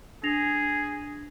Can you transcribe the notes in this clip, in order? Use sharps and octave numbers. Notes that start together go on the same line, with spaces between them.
D4 G#4 A#6 F7